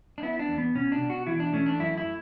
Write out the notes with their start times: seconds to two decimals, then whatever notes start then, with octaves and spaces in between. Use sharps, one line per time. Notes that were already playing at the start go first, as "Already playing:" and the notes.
0.18 D4
0.22 B3 E4
0.39 D4
0.49 E2
0.58 B3
0.75 B2 C#4
0.92 D4
1.01 B2
1.10 F#4
1.27 E3 E4
1.40 D4
1.53 A3 C#4
1.66 D4
1.79 F#2 E4
1.98 E4